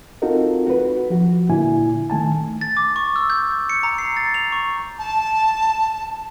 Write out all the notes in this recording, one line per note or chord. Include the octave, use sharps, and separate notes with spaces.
C4 D#4 F4 F#4 A4 A#4
F#4 B4
F3 F#4
A#2 D3 E4 G#5
D#3 A3 G#5 A5
A6
D6
C#6
E6
G6
C#7
A#5
C7
A6
F7
C#6
A5